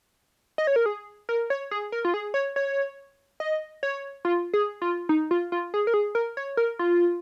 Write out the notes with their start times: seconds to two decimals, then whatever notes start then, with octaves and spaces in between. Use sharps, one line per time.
0.58 D#5
0.67 C#5
0.76 A#4
0.86 G#4
1.29 A#4
1.50 C#5
1.71 G#4
1.92 A#4
2.05 F4
2.14 G#4
2.34 C#5
2.56 C#5
3.40 D#5
3.83 C#5
4.25 F4
4.54 G#4
4.82 F4
5.09 D#4
5.31 F4
5.52 F4
5.74 G#4
5.87 A#4
5.94 G#4
6.15 A#4
6.37 C#5
6.57 A#4
6.79 F4